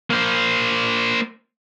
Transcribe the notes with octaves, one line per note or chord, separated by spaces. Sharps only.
A#3 C5